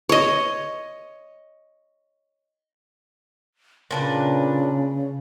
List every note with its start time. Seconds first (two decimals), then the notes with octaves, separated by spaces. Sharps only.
0.09 C#5 D#5
3.91 A#2 C#3 D4 B4